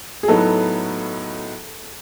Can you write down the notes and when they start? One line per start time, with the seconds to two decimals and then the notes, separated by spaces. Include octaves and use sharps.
0.23 G#4
0.28 A2 F#3 B3 D#4 A4